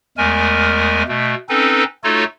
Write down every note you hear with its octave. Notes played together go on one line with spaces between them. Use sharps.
E2 G#3 A3 A#4 G#5
B2 A3
C4 C#4 D#4 A4 B4
A3 D#4 F4 F#4 A4 C#5